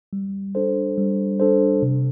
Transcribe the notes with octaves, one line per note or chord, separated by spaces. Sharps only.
G3
D4 A4 C5
G3
D4 A4 C5
C3